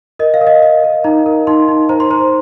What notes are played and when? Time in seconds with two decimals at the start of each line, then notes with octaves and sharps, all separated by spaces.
0.19 A#4 D#5
0.34 F5
0.41 A#4
0.47 D#5
0.62 A#4 D#5
0.84 A#4
1.04 D#4 A#5
1.26 A#4
1.47 D#4 C6
1.68 D#4
1.89 C5 A#5
2.00 C6
2.11 C5 A#5